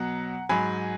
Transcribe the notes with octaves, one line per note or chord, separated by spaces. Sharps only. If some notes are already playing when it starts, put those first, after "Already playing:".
Already playing: B2 F#3 F#5 A#5
G#2 F#3 G#5 B5